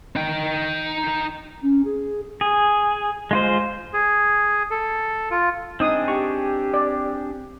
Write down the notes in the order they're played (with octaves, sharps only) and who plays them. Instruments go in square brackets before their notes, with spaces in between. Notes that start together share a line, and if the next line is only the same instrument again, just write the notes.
[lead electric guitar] D#4 G5
[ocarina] C#4
G#4
[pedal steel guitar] G#4
G#3 F4 C5
[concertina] G#4
A4
F4
[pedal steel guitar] C4 D4 G#4 [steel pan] D#4 D#6
[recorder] G4 [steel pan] C#6
[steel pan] D5